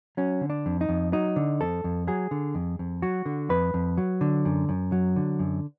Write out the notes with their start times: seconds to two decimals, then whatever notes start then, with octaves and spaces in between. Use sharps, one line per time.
0.17 F#3 C#4
0.41 D3
0.50 D4
0.66 F2
0.81 D#4
0.89 F2
1.13 F#3 D#4
1.36 D3
1.61 F2 A4
1.84 F2
2.07 F#3 G#4
2.31 D3
2.55 F2
2.79 F2
3.02 F#3 F#4
3.26 D3
3.49 F2 B4
3.74 F2
3.97 F#3
4.21 D3
4.45 F#2
4.69 F#2
4.92 F#3
5.16 D3
5.39 F#2